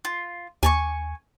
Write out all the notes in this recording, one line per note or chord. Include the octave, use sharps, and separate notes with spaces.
F4
D#2 G#5 A5 C#6